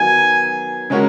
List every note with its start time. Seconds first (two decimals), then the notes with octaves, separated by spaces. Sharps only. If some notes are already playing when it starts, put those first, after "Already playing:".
Already playing: D#3 F#3 B3 D#4 G#5
0.90 C#3 G#3 C#4 F#4 A#4